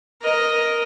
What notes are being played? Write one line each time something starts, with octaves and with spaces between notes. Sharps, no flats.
A#4 D#5